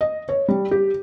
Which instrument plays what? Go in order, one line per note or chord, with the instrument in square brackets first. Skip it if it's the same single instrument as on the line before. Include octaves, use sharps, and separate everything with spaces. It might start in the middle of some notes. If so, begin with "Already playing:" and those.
[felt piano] D#5
C#5
G3
G4